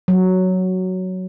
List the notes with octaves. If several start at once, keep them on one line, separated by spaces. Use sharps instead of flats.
F#3